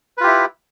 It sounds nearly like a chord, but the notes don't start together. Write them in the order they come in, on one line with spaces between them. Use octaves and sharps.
B4 F4 G4 E4